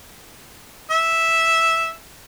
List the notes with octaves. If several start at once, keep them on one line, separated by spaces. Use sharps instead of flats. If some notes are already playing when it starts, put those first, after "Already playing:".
E5